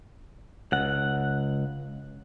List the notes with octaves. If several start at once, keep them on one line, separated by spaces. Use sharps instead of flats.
C#2 F#5